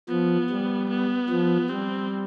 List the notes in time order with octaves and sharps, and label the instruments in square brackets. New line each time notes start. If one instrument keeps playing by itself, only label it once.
[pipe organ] F3 [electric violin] B3
[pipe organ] G3
[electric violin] B3
[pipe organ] F3
[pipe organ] G3 [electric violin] C4